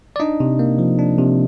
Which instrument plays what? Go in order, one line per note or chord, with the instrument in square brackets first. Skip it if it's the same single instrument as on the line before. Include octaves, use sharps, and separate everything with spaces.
[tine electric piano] D5
D4 D#4 D#5
C3
A#3
F3
D4
C3